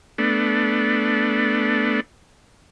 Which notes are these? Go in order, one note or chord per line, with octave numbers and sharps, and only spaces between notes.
A3 B3 D4